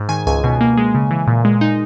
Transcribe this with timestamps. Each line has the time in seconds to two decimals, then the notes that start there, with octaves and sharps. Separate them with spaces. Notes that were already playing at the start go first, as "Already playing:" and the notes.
Already playing: G#2
0.09 D#3 G#5
0.27 C#2 G#5
0.44 B2
0.61 A#3
0.77 G#3
0.95 C#3
1.11 E3
1.27 A#2
1.45 G#3
1.61 D#4